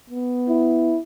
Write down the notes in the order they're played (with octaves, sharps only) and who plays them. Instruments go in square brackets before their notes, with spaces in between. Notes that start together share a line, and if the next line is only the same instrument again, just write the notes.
[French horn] B3
[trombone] E4